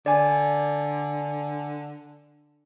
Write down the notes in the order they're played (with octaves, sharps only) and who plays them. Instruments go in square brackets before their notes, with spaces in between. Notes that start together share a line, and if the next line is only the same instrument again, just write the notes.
[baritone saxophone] D3 [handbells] D5 G#5